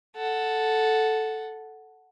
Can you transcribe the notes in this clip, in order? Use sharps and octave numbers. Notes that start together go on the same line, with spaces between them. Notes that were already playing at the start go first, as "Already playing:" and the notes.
A4 F#5